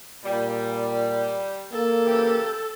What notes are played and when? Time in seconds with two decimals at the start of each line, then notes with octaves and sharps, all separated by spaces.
0.25 A#2 G3
1.72 A#3 A4
2.05 C#3 E3 G4